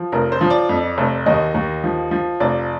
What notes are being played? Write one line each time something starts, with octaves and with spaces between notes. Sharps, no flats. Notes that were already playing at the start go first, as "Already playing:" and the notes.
Already playing: F3
F1 A#4
C5
F3
D5
F2
F1
D#2 D#5
D#2
F3
F3
F1 D5